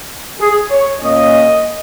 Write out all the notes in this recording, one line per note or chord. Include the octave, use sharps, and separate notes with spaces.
G#4
C#5
A#2 A#3 C#4 D#5